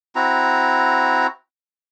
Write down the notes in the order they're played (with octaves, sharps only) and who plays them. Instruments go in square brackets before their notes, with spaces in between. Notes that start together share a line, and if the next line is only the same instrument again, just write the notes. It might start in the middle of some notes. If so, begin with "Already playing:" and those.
[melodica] C4 E4 F#4 A#5